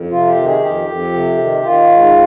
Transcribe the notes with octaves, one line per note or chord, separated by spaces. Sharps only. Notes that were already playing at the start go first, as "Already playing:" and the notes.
Already playing: F2
C3 F4
G4
D#3
G#4
F2 G4
F2
C3
D#3
D#3 F4
G#2